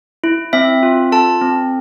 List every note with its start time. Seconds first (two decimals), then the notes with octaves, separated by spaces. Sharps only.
0.24 E4
0.53 C4 E5
0.83 F4
1.12 A4 A5
1.41 C4